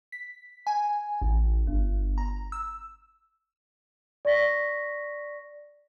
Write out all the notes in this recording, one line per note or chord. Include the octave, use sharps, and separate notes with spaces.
B6
G#5
A1
G1
A#5
E6
D5 C#6 A#6 B6